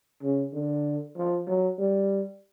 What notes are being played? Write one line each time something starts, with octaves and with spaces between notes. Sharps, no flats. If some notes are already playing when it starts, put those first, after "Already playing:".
C#3
D3
F3
F#3
G3